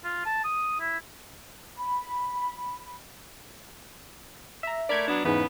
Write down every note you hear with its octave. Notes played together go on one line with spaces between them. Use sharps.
F4
A5
D#6
E4
B5
E5 A#5
A3 A#4 D5 B5 G#6
F#3 B3 D4
E2 G#2 C#3 B3 B4